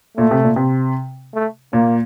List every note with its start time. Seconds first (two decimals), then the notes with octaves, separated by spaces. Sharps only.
0.17 A#2 A3
0.31 C3
0.44 A#2
0.56 C3
1.34 A3
1.73 A#2 A#3